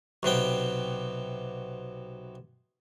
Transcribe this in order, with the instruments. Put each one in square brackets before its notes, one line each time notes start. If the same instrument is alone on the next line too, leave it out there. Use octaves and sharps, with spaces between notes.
[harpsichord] B1 C3 B3 G5